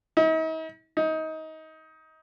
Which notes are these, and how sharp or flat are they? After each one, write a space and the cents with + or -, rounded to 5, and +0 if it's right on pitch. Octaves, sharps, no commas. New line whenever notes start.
D#4 +45
D#4 +25